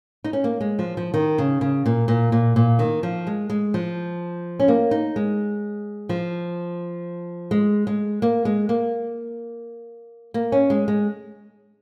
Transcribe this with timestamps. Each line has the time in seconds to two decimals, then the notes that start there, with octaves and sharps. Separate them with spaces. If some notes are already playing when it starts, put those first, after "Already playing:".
0.24 D#4
0.33 C#4
0.44 A#3
0.61 G#3
0.79 F3
0.97 F3
1.14 D#3
1.38 C#3
1.61 C#3
1.86 A#2
2.08 A#2
2.32 A#2
2.56 A#2
2.79 D#3
3.03 F3
3.27 G#3
3.50 G#3
3.74 F3
4.60 C#4
4.68 A#3
4.91 D#4
5.16 G#3
6.09 F3
7.51 G#3
7.87 G#3
8.22 A#3
8.45 G#3
8.69 A#3
10.34 A#3
10.52 C#4
10.70 G#3
10.88 G#3